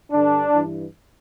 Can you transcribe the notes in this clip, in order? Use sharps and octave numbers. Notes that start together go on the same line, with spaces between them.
G2 D3 D4
G2 E3